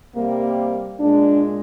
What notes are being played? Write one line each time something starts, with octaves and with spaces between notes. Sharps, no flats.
C3 G3 A#3
A#2 G#3 D4